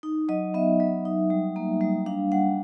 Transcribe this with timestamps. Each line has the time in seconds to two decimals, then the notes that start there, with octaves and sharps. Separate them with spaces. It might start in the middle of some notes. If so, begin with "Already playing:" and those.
0.03 D#4
0.29 F#3 D#5
0.54 B3 E5
0.80 F#3
1.05 D#4
1.30 G3
1.56 A#3
1.81 G3
2.06 D4 F5
2.32 G3 F#5